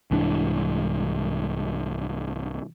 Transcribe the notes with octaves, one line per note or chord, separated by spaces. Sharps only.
C2 G#2 E3 D4